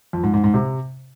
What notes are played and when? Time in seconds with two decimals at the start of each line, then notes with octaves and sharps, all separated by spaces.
0.13 F2
0.23 G#2
0.34 G#2
0.44 G#2
0.54 C3